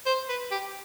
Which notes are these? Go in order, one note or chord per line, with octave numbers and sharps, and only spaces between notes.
C5
B4
G4